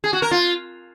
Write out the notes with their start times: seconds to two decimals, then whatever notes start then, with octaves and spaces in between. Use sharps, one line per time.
0.04 G#4
0.13 F#4
0.22 A#4
0.31 F4